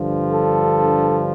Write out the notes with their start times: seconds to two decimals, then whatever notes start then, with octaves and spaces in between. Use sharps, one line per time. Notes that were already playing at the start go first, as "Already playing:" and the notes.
Already playing: G2 D3 F3
0.32 A4